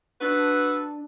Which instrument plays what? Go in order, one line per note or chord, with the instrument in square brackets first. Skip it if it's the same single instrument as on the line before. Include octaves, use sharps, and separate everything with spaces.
[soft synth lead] D4 [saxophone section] F#4 A4 B4